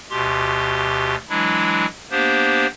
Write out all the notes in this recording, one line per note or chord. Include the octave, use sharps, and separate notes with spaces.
D2 B2 G4 C6
E3 F#3 G#3 D4 E4
A#3 B3 D4 G4 C5